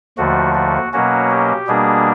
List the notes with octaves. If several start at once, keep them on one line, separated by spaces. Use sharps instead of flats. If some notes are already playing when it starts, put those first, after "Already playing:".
D#2 D3 F3 A3 F#4
F#4
B2 F#3 A#3 C#4 F#4
G4
B2 G3 A#3 D4 G#4